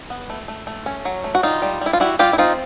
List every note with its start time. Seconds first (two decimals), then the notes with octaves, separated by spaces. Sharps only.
0.10 B3
0.30 A3
0.48 A3
0.67 A3
0.86 C#4
1.05 F#3
1.24 A3
1.35 F#4
1.43 G3 D#4 F4
1.62 G3
1.81 G3 E4
1.93 F4
2.00 G3 E4 F#4
2.19 G3 F4 G4
2.33 E4
2.38 C4 D#4 F4